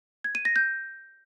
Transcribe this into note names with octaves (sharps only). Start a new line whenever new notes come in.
G#6
D#7
A#6
G6